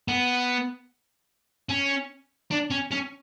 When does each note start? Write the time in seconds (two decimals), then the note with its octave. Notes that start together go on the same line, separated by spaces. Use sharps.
0.08 B3
1.70 C#4
2.51 D4
2.71 C#4
2.92 C#4